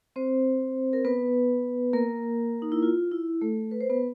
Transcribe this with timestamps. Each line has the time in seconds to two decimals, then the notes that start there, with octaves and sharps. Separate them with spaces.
0.16 C4 C5
0.93 A#4
1.05 B3 B4
1.93 A#3 A#4
2.62 D#4
2.72 E4
2.83 F4
3.12 E4
3.41 A3 A4
3.71 B4
3.81 C5
3.90 B3 B4